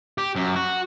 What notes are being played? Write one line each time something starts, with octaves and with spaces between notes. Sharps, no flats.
G4
F#2
F#4